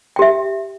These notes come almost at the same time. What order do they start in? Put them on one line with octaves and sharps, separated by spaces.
G5 G4 E5